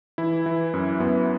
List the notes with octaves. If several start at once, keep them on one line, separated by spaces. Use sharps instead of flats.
E3 E4
E3
F#2
F#2 B3